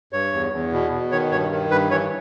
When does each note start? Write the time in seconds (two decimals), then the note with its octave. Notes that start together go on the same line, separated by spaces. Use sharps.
0.13 G2 C#5
0.33 E2
0.52 E2
0.73 B2
0.92 B2
1.12 D#3 C#5
1.31 G2 C#5
1.51 D#3
1.70 G2 B4
1.91 E3 C#5